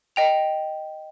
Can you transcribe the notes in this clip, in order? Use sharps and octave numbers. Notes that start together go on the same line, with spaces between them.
D#5 G5 F7